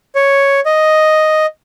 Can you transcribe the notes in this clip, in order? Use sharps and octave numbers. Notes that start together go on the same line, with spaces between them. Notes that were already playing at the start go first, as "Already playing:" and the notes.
C#5
D#5